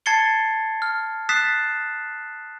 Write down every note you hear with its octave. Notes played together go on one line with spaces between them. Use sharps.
A5 G#6 A6 C7 C#7 G7
F6
D#6 F#6 A6 B6 C7 E7